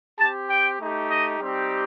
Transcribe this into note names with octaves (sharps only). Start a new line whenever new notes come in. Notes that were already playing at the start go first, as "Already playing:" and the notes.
C4 G4 A5
G5
A3 D#4 G4
D#5
G3 C4 D#4 G4